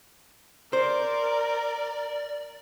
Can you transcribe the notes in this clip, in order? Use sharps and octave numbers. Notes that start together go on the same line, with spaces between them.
A#4 C5 D5